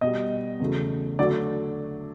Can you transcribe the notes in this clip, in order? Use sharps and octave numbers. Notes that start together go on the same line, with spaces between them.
B2 D#5
G3
E2 C#3 F#3 A3
D3 F#3 A3 D5